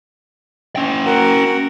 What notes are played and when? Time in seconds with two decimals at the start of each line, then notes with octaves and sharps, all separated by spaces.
0.76 C#4 G5
1.06 F#4 A#4 F#5